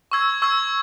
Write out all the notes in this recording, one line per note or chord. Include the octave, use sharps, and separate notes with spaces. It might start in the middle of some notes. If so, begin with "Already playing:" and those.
C#6 E6 G#6
C#6 E6 G#6